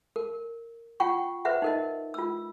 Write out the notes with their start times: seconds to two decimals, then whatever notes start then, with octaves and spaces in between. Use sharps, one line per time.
0.16 A#4
1.00 F4 F#5 G5 C#6
1.45 B4 C5 E5 F#5
1.62 D#4 A#4 D#5
2.14 F4 E6